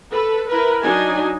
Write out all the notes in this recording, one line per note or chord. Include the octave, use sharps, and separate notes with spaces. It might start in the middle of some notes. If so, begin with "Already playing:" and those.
A4 B4
E4 A#4 B4
F#3 D4 D#4 G#5